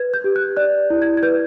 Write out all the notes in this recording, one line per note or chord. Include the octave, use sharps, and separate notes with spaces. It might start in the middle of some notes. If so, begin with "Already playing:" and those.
Already playing: B4 G#6
G6
G4
F#6
D5 F#6
E4
G#6
G#6
B4 G6